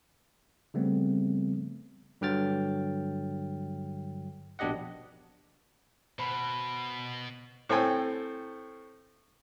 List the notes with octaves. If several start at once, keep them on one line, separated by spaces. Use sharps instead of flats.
C#3 F3 G3 A3 B3 C4
G2 D3 F#3 G5 F6 A6
A#1 B2 D4 G4 D#5 F#5
B2 C5 B5
A2 C4 A4 G5 G#5